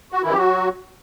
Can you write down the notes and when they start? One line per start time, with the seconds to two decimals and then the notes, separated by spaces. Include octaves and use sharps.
0.12 F#4
0.22 F#2 D#3 E3 E4
0.32 G4
0.37 F#3 F#4